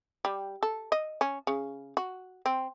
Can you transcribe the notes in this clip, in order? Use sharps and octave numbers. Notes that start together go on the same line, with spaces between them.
G3
A4
D#5
C#4
C#3
F#4
C4